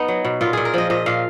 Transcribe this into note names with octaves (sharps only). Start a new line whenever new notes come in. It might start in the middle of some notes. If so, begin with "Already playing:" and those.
Already playing: B3 D#4
F#3
B2
A#2 F4
A#2 G#4
A#4
F3 D#5
A#2 D#5
A#2 F5